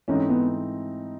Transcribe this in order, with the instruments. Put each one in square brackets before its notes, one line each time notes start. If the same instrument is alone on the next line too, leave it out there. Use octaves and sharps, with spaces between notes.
[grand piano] G#2 E3 A3 C4 D#4 [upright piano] C#4
[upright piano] B3